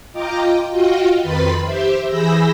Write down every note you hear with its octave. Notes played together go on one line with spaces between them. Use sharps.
F4 D#5 G5 A#5 D6
F4 F#4 D#5 F5 G5
F2 D#3 B4 B5 C6 A6
G4 C5 E5
E3 G#4 B5 E6 G6 A#6